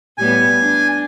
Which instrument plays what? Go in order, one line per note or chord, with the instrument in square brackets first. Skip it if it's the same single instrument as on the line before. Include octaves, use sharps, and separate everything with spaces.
[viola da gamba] A2 G3 B3 [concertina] G#5
[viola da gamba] D4